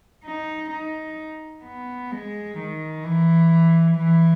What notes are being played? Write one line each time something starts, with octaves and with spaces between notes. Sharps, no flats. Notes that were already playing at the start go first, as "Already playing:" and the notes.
D#4
D#4
B3
G#3
D#3
E3
E3